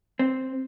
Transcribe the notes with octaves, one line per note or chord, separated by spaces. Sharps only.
C4